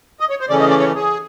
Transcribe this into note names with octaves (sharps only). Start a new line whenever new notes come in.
D#5
C#5
C5
C#3 E3 A3 C#4 D5
D#5
D5
C#5
G#4